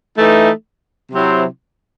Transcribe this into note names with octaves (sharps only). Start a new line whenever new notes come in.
E3 A3 D#4
C3 F#3 C4 E4